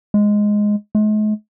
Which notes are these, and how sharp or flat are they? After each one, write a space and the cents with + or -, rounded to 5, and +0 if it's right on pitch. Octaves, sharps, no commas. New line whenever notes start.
G#3 +0
G#3 +45